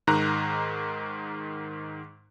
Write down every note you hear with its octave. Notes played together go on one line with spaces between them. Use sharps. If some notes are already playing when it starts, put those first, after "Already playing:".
G#2 D#3 A#5 F#6